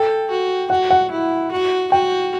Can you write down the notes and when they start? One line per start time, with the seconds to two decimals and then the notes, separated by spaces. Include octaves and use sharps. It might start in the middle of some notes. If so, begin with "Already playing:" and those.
Already playing: A4 G5
0.30 F#4
0.70 F#4 F#5
0.91 F#5
1.11 E4
1.52 F#4
1.92 F#4 G5